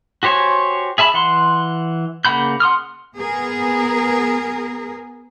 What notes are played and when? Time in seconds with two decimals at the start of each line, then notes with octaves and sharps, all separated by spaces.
0.23 F#4 G4 C5 C#5 G#5
0.98 G#4 E5 A5 B5
1.14 E3 F#5 C6
2.25 C#3 A#3 F#5 B5 G6
2.60 F#5 C6 D#6 F6
3.17 B3 G#4 A#4